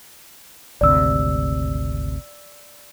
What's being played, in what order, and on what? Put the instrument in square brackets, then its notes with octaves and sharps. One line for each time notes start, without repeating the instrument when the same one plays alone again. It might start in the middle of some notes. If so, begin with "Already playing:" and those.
[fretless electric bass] G#1 D2 C3 [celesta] D5 E6